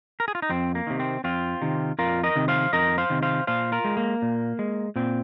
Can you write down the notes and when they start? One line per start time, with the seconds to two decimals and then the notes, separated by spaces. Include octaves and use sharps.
0.20 A#4
0.28 G#4
0.35 F4
0.42 D#4
0.50 F2 C4
0.75 A#3
0.87 C3 D#3
1.00 C4
1.24 F2 C4 F4
1.62 C3 D#3
1.99 F2 F4 A#4
2.23 A#4 D#5
2.36 C3 D#3
2.48 C5 F5
2.73 F2 A#4 D#5
2.98 C5 F5
3.10 C3 D#3
3.23 C5 F5
3.47 A#2 C5 F5
3.72 F4 A#4
3.84 G#3
3.97 A#3
4.22 A#2
4.59 G#3
4.96 A#2 C4